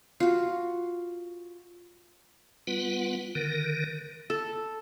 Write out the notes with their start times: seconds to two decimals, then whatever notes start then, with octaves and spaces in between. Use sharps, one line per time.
0.20 F4 F#4
2.67 G3 B3 F4 B4 F#5
3.35 D3 D#3 A#4
4.30 A4